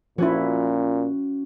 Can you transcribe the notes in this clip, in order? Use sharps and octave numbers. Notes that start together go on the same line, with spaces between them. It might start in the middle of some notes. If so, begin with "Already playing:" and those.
A#2 F3 C#4 E4 F#4